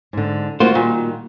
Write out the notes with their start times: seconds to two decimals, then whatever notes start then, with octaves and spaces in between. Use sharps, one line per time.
0.13 G#2 D3
0.60 D#3 G3 A#3 F4 F#4 C5
0.75 A#2